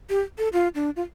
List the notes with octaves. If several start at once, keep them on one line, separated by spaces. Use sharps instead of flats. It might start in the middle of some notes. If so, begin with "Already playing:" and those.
G4
A4
F4
D4
F4